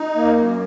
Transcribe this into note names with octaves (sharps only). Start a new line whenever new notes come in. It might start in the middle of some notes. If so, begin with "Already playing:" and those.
Already playing: D#4
A#3
F#2